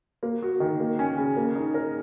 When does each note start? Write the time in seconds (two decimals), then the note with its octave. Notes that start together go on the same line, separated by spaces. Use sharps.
0.23 A#3
0.43 F#4
0.60 D#3
0.80 A#3
0.99 C#4
1.18 C#3
1.36 A#3
1.55 D#4
1.74 A#4